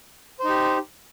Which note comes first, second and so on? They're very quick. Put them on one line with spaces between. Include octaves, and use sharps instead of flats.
C5 D#4 G4